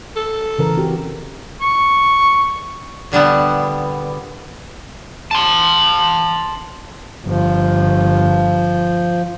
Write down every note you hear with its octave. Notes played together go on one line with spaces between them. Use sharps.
A4
C#3 E3 A#4
C4 F#4 G4
C#6
A#2 D3 G3 B3
A5 C6
G1 F3